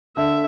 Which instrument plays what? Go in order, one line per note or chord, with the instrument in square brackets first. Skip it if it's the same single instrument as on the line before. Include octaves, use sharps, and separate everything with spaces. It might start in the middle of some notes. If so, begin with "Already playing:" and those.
[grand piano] D3 [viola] E5